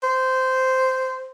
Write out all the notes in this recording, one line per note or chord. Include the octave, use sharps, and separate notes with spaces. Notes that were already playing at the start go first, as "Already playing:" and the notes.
C5